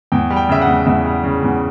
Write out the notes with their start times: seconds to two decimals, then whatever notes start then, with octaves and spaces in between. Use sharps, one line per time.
0.12 E2 G5
0.30 G3
0.37 G5
0.49 C#3 E5
0.61 F#5
0.68 E2
0.86 E2 E5
1.05 G3
1.24 C#3
1.43 E2